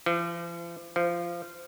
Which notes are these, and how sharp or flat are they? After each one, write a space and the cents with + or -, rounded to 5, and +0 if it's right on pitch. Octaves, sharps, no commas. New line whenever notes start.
F3 -45
F3 -20